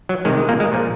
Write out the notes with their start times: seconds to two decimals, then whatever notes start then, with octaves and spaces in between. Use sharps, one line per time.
0.09 F#3
0.25 C3 D#3 G#3
0.37 G#3
0.49 A#2 A#3
0.60 G#3
0.72 A#2 F3